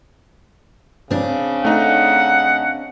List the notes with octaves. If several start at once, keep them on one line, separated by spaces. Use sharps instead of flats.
C#3 C4 D4
A3 D#4 F#5